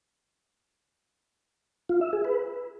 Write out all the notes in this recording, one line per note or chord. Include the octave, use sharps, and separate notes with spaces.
F4
E5
G#4
B4